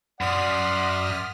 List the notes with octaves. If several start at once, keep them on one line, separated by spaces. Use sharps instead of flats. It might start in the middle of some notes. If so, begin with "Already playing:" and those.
F#2 D5 F#5 C6 D#6 F6 B6